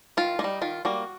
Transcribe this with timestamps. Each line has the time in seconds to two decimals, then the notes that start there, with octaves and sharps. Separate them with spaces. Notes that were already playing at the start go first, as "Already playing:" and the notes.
0.17 D#3 F4
0.39 A#3 D#4
0.44 G3
0.61 D#3 F4
0.85 G3 A#3 F#4